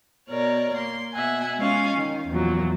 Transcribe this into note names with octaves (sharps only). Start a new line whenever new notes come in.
B2 A#4 C#5 D5
A#3 C6
B2 E5 F#5 G#5
G#3 C#4 F4 F5
D#3
E2 A#2 F3 F#3